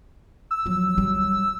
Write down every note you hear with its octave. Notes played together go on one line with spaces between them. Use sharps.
E6
F3 F#3
F#3 G3